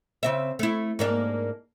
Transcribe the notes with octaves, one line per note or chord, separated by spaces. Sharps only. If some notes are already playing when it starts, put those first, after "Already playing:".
C#3 C4 E5
A3 E4
G#2 A#3 D4